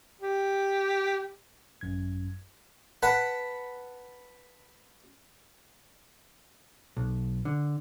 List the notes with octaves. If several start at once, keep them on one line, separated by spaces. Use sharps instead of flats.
G4
G#1 F#2 G#6
B4 F#5 A5 B5
B1
D3